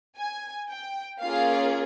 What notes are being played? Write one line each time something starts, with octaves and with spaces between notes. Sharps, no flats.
G#5
G5
A#3 C#4 F4 G#4 F5